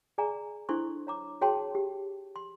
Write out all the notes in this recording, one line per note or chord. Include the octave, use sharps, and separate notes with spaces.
G#4 D5 G#5 A#5
D4 E4 A4 C5 C6 C#6
C#5 A#5 D6
F#4 G#4 C#5 G5 A5 C6
G4
C6